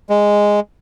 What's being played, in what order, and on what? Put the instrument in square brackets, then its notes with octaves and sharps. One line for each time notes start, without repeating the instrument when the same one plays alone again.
[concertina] G#3